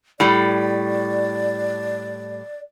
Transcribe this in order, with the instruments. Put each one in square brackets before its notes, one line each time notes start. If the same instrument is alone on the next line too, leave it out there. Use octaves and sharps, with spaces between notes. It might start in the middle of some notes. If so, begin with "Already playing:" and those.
[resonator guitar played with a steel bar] A2 G3 [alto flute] D5